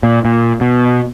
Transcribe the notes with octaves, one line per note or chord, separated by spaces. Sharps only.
A#2
A#2
B2